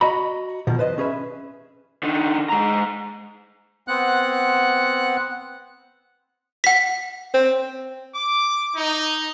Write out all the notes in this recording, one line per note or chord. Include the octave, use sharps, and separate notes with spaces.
F#4 D#5 A#5 B5
B2 D#3 F3
B4 C5 D#5
C#4 G#4 B4 E5
D3 D#3
G#3 A#5
B3 C4 F#5 F#6
F#5 B6
C4
D6
D#4